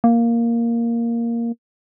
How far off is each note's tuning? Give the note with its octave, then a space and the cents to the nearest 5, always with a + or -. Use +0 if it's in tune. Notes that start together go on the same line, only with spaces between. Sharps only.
A#3 +0